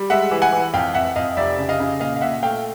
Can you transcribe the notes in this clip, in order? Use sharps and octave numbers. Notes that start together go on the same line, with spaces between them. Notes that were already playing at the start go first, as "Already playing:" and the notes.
Already playing: G3
G#3 E5 F#5
E3
F#5 G#5
E3
F2 F5 G5
F2 E5 F#5
F2 D#5 F5
F1 D5 E5
C#3
D#5 F5
C#3
A#2 D#5 F5
F5
A#2 E5 F#5
A3 F5 G5